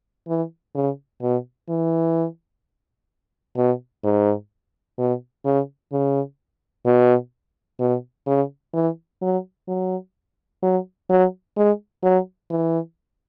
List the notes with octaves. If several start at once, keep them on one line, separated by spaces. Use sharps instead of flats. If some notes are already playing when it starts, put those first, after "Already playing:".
E3
C#3
B2
E3
B2
G#2
B2
C#3
C#3
B2
B2
C#3
E3
F#3
F#3
F#3
F#3
G#3
F#3
E3